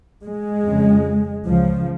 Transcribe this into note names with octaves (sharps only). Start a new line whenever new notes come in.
G#3
F2 C#3
C#2 C#3 F3